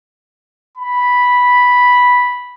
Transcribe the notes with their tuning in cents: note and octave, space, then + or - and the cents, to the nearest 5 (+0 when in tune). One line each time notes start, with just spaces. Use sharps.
B5 -5